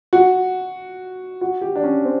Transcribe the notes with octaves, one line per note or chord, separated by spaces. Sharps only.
F#4
F#4
G4
D4
C#4
C4